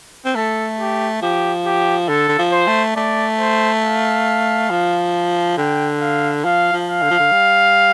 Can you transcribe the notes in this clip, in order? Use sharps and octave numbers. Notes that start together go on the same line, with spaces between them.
C4
A3 A4
G4
F3 G4
G4
D3 A4
D3
F3
C5
A3
A3 D5
C5
F5
F3
D3 G5
F5
F3 F5
F3
F5
D3
F3
D3
G3